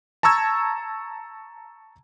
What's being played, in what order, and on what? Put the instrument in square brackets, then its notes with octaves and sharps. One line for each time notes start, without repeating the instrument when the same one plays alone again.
[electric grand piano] A5 A#5 C#6 E6 G#6